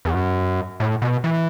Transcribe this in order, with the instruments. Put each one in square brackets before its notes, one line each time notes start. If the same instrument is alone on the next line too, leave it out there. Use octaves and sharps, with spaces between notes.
[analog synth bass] E2
F#2
A2
B2
E3